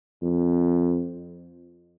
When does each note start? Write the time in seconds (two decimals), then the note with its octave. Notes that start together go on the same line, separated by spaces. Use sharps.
0.22 F2